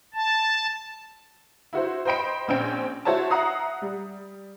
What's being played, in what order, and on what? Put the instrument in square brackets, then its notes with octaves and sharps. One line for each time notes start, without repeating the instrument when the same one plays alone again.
[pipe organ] A5
[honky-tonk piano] E4 F#4 C5
C5 D#5 G5 B5 D7
A#1 C4 C#4 G5 D7
E4 F#4 C5 C#5 E5 A5
E5 F#5 A#5 D#6 C7
G3